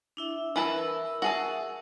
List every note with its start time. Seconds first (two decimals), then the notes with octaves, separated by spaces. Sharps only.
0.17 D4 E4 E5
0.56 E3 A#4 B4 E5 A5 E6
1.22 F#4 G#4 A5